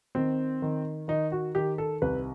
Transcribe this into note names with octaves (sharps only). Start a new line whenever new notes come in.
D#3 C4
D#3
D#3 D#4
F#4
D#3 G4
A4
C2 B4